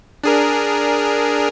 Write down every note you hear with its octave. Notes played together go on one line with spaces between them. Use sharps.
D4 G#4 A#4